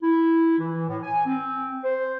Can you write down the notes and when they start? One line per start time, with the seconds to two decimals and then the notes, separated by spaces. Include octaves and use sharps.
0.03 E4
0.59 E3
0.88 A2
1.03 G#5
1.26 C4
1.84 C5